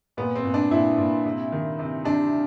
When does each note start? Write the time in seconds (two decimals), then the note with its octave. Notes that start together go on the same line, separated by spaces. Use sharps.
0.17 A#2 B3
0.36 C4
0.45 A#2
0.54 D4
0.71 A#2 E4
0.98 A#2
1.25 C3
1.52 D#3
1.79 C3
2.05 C3 D4